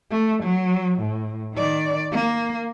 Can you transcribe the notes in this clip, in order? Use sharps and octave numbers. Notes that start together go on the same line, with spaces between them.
A3
F#3
A2
D#3 D5
A#3